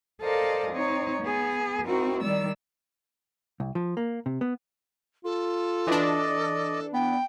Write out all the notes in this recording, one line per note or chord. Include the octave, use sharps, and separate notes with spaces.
A4 A#4 C5 D5 D#5 F5
C4 D#4 C#5
B3 G#4
C4 D#4 E4 F#4 A#4
D#3 G3 D5 E6
C2
F3
A#3
C3
B3
F4 A4
E3 D4 D5 D#5
B3 G5